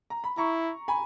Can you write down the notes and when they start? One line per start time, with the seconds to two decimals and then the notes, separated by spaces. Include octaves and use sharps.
0.10 A#5
0.24 B5
0.37 E4 A#5 C#6
0.88 G#5 B5